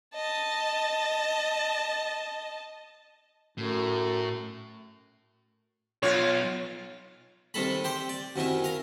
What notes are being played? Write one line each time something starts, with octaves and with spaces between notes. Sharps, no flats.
D#5 A5
F#2 A2
B1 F4 C#5
C3 D#3 G3 A4 B5
G4 C5 G5
D5
F#2 C3 D#3 E4
A#4 F5